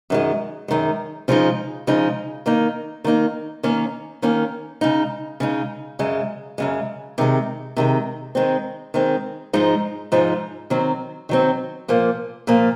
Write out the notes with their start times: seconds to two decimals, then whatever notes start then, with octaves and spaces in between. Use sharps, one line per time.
0.10 F#2 D#3 G#3
0.68 F#2 D#3 G#3
1.28 C#3 F3 G#3 D#4
1.87 C#3 F3 G#3 D#4
2.46 D#3 A#3 D#4
3.04 D#3 A#3 D#4
3.63 D#3 A#3 C#4
4.22 D#3 A#3 C#4
4.81 C#3 G#3 D#4
5.40 C#3 G#3 D#4
5.99 F#2 C#3 G#3
6.58 F#2 C#3 G#3
7.18 C3 D#3 G#3
7.77 C3 D#3 G#3
8.35 D#3 G#3 C4
8.94 D#3 G#3 C4
9.53 G#2 F3 G#3 D#4
10.12 G#2 F3 G#3 D#4
10.70 D#3 F#3 C4
11.29 D#3 F#3 C4
11.88 A#2 F3 A#3
12.47 A#2 F3 A#3